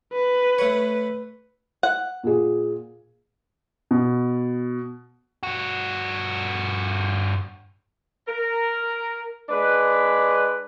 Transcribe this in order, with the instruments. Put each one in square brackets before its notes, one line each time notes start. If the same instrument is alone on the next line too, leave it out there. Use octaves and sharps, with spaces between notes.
[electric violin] B4
[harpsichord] A3 C#5
[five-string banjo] F#5
[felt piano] A#2 G#4
[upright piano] B2
[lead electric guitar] G2 F#4
[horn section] A#4
G#3 D4 B4